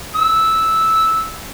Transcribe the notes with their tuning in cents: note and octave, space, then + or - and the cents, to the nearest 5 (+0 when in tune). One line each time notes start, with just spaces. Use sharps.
E6 -10